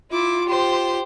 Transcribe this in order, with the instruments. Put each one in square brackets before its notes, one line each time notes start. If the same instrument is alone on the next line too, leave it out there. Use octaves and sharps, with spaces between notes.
[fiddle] E4 D6 [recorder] F4
[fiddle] G4 C5